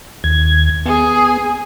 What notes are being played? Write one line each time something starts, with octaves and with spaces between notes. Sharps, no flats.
D#2 G#6
B3 G#4